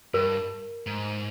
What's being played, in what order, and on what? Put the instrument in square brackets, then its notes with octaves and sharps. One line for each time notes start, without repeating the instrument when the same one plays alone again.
[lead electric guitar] G2 [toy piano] A#4
[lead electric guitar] G#2